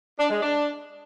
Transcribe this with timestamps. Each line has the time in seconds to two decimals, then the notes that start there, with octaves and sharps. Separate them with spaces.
0.18 D4
0.30 G#3
0.42 D4